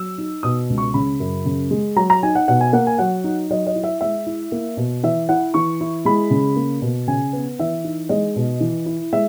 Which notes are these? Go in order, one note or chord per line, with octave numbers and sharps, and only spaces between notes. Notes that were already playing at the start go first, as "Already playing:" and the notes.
Already playing: F#3 E6
D#4
B2 D#6
C#2
C#6
C#3 B5
F#2
C#3
G#3
F#3 A#5
A#5
D#4 G#5
F#5
B2 F#5
G#5
A#3 F#5
G#5
F#3 F#5
D#4
F#3 D#5
D#5
E4
E5
G#3 E5
E4
A#3
B2
E3 E5
E4 F#5
E3 C#6
E4
G#3 B5
C#3
A#3
B2
C#3 G#5
B3
E3 E5
D#4
G#3 D#5
B2
E3
E4
G#3 E5